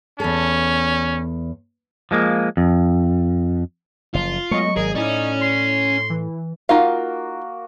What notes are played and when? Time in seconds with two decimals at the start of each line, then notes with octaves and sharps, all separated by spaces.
0.20 E2 C#4 A4
2.11 F3 G#3 A#3
2.57 F2
4.14 F#1 F3 F4
4.51 F#3 G#3 A3 B3 D#5 C#6
4.76 G#1 G#4 A#4
4.95 A2 C#4 D#4 E4 D5
5.41 C6
6.10 E3
6.69 A#3 D#4 F4 F#4 F5